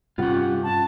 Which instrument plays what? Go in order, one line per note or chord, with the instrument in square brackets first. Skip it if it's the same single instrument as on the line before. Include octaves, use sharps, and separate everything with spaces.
[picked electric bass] G2 C3 G3 [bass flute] C#4 [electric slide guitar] F4 G4 [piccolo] F#5
[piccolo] F#5
A5